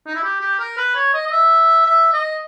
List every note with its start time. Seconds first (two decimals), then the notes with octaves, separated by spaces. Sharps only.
0.06 D#4
0.15 E4
0.23 G4
0.41 G4
0.59 A#4
0.77 B4
0.95 C#5
1.14 D#5
1.26 D#5
1.31 E5
1.86 E5
2.13 D#5